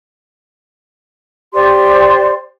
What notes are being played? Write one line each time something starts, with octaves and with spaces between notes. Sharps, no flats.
G4 C5 D5 C6